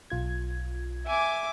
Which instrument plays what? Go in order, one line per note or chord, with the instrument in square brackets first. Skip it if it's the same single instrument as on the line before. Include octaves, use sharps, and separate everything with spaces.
[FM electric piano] B1 F4 G#6
[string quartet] E5 G#5 D6